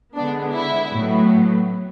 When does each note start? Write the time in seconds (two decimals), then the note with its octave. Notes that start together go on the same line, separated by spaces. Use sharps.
0.15 D3 G#3 B3 D4
0.53 E4
0.91 A2 F#3 B3